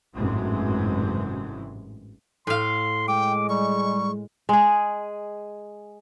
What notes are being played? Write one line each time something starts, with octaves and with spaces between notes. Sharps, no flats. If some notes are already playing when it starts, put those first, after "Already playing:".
G#1 F#2 A2 C3 E3 G#3
A2 F5 C6
G#3 G5 D6
G3 C#6
G#3 G#4